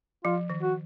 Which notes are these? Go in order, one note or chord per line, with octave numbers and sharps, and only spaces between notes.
F3 F4
D#3
F#4